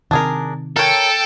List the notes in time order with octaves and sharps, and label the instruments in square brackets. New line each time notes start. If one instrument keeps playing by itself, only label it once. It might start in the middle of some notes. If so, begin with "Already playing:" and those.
[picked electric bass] C3 D#3 [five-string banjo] D4 G#4 A#4
[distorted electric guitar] A4 [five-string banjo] A#4 C#5 [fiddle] G5